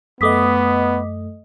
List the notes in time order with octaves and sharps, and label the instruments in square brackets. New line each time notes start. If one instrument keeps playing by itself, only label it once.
[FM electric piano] F#2 A3 D#5 [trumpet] B3 [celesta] D6 D#6 B6